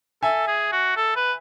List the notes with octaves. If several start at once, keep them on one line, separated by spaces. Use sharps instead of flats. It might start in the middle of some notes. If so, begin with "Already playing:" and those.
A4 E5 G#5
G#4
F#4
A4
B4